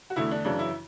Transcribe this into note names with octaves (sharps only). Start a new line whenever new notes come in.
F#4
E2 D3 A3 E4
D4
F#2 C#3 E3 D4
E4